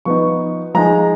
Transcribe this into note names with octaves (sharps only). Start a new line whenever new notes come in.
F3 B3 D#4 C#6
F3 G#3 D#4 A#5